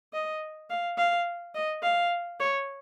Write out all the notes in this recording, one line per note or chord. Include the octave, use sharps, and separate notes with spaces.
D#5
F5
F5
D#5
F5
C#5